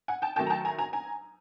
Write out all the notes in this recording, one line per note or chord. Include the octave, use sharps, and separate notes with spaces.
F#5 G#5
G5 A5
D#3 F#3 A3 G5 A5
A#5
G5 A5
G#5 A#5
G#5 A#5
G#5 A#5